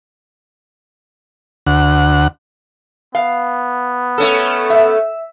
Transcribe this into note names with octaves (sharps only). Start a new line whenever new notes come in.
D2 F#5
B3 F5
A3 C#4 A4
E5